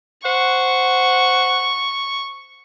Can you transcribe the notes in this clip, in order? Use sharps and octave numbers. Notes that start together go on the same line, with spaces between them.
C5 F#5 C#6